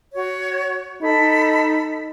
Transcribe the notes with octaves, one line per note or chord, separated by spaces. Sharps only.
F#4 C#5
D#4 A4 B5